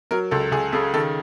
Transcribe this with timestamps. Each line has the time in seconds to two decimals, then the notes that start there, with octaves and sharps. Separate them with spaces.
0.11 F#3 A#4
0.31 C#2 A4
0.52 C#2 G#4
0.72 C#3 A4
0.94 D#3 A4